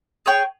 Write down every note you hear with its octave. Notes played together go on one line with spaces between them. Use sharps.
G#4 C#5 G5